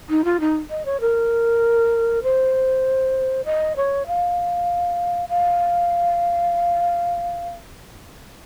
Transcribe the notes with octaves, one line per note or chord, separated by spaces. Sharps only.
D#4
F4
D#4
D#5
C#5
A#4
C5
D#5
C#5
F5
F5